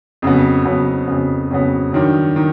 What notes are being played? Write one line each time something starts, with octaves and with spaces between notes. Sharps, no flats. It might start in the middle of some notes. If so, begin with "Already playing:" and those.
F2 C#3 F#3 B3
F2 C#3 F#3 B3
F2 C#3 F#3 B3
F2 C#3 F#3 B3
G2 D#3 F#3
D#3